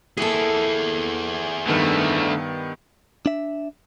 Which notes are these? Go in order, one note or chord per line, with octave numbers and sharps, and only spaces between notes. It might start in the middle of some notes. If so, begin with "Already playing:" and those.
A#3 E4 G#4 A4
G2 D3 D#3 A3 B3
D4 E5